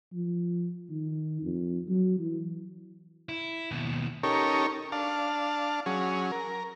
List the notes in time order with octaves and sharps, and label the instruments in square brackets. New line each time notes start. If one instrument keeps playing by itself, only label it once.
[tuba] F3
D#3
F2
F#3
E3
[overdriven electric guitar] E4
D#2 B2
[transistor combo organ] C#4 D#4 G4 A4 A#4 C#5
D4 F5 A5
F#3 C#4 G#4
A#4